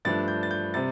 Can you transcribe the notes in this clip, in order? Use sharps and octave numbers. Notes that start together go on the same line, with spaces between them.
G2 F3 A3 D4 A6
G6
A6
G6
C3 G3 C4 A6